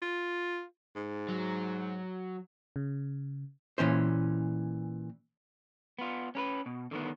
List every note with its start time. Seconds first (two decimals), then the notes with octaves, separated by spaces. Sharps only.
0.02 F4
0.96 G#2
1.29 F#3
2.76 C#3
3.78 A#2 E3 C#4 C5
5.99 B3 F4
6.35 C#4 A#4 B4
6.66 B2
6.91 D3 D#3 B3